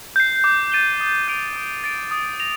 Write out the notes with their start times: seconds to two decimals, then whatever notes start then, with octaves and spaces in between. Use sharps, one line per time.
0.16 G6 C7
0.44 D6
0.72 A6 D#7 G7
1.00 D#6
1.28 G6 D7 F7
1.56 D#6
1.84 A6 D7
2.11 D#6
2.40 A#6 F7